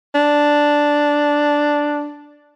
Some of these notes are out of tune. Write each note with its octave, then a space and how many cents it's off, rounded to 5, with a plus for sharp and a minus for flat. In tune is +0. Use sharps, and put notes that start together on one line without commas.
D4 +0